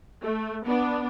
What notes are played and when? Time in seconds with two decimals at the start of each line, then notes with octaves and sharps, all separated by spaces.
0.21 A3
0.65 B3 D4